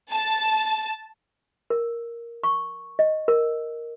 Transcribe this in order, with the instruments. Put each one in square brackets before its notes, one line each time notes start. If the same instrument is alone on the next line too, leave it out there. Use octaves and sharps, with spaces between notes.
[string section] A5
[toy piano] A#4
C#6
D#5
A#4